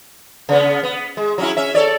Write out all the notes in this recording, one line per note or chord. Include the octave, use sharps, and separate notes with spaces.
C#3 B3
B3
G#3
F#3 C#4 E4
C#4 E5
A4 C#5 D5